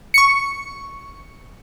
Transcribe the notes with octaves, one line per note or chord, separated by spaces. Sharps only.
C#6 C#7